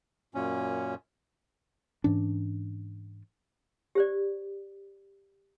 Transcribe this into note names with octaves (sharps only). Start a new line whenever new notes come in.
F#2 A#2 C#4
G#2 E3 C#4 D4
G4 C5 D5